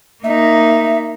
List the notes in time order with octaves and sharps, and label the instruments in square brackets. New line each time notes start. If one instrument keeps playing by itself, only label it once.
[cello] A#3 D#4 [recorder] E5